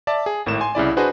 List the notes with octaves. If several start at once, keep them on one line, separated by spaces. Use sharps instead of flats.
D5 E5 A5
G#4
G#1 A2 A#4 E7
G#5 C6
C2 C#3 E4 D5
D4 F#4 G#4 B4 C5 D#5